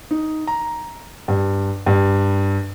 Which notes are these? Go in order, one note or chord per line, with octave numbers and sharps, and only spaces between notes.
D#4
A#5
G2
G2